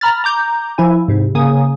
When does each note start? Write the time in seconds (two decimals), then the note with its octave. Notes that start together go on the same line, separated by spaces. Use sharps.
0.01 A#5 B5 F6 A6
0.24 A#5 D6 G6
0.78 F3 E4 G#5
1.08 G#2 C3
1.35 C#3 A#3 G#5 D#6